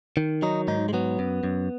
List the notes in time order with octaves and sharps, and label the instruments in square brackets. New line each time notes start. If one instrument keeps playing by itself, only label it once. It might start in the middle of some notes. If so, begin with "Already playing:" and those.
[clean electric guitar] D#3
F#3 D#4
G#2 D#4
G#3
F#3 B3
F#2
F#2